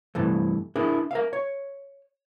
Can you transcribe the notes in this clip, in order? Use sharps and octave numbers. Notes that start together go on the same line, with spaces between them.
G2 C3 E3 A3
D4 E4 G#4 A#4
A#4 E5 F5
C#5